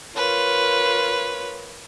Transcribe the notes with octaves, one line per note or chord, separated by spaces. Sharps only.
F4 A#4 B4 C#5